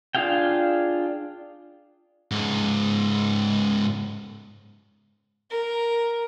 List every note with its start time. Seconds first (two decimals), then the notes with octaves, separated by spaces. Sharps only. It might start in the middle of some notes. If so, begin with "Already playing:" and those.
0.15 D4 F4 G#4 F5 G5
2.31 C#2 G#2
5.51 A#4